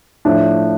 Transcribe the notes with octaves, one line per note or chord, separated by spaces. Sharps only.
A2 F3 D4